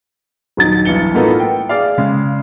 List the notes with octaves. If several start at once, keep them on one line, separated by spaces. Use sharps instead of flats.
D#1 F#3 D#4 A6
B1 G2 E3 C#7 G7
A2 A#3 B3 D#4 F4 A4
G5
G#4 D5 F5
C#3 G#3